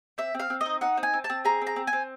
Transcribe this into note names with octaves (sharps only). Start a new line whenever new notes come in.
C4 E5
C4 F5
C4
D#5
D#4
D#4 F#5
C4
G#5
C4
A5
C4
G#4 A#5
C4
A#5
C4
G#5
C4